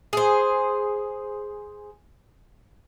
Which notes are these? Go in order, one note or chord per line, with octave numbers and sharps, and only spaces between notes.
G#4 C5